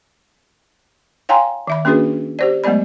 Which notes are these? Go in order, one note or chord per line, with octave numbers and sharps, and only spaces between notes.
C#5 F5 G5 G#5 A#5 C6
D#3 E5 B5
A#3 C#4 D4 F#4 G#4 B4
G4 C5 D5
F#3 G#3 A3 B3 D5 B5